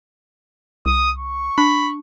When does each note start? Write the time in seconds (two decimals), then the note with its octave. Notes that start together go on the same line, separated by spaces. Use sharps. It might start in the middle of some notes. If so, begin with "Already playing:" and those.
0.86 C2 D#6
1.18 C#6
1.58 D4 B5